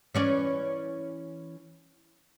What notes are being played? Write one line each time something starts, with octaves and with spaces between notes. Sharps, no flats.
E3 C#4 D5